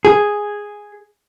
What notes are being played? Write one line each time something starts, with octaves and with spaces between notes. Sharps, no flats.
G#4